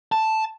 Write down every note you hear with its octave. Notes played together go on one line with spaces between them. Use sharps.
A5